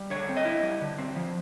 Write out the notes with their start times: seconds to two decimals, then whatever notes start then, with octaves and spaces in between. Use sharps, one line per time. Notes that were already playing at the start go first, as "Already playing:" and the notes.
Already playing: G3
0.10 D3 C#5
0.29 C4
0.37 D#5
0.45 E4
0.63 G3
0.81 D3
0.98 C4
1.16 F3